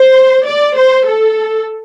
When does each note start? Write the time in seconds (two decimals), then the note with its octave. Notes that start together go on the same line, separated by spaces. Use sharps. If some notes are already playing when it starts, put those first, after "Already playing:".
Already playing: C5
0.45 D5
0.76 C5
1.06 A4